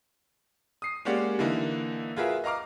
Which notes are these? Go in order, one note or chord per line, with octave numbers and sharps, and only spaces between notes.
D#6 C7
G#3 A#3 C#4 G4 D5 F#5
D3 E3 A#3 D#4 E4
F4 F#4 G#4 A#4 B4 E5
D#5 F5 A#5 D6 F6